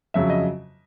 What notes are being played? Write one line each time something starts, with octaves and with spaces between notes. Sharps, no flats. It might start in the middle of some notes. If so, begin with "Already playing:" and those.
F2 C#3 F#3 E5
D#5